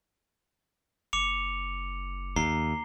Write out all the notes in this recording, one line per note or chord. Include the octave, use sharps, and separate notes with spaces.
F#1 D6 C#7 F7
D#2 A#5 C7 G7